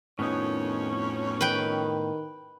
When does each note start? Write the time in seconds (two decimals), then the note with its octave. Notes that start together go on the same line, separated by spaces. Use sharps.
0.19 F2 A2 D#3 B3 C#4 D#4
1.41 D#3 B4 G5